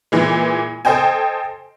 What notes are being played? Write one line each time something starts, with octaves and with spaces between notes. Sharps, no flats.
A#2 E3 G#3
A4 C5 D#5 G5 G#5